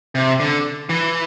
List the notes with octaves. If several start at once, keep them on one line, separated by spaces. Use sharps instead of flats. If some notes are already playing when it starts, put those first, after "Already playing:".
C3
D3
E3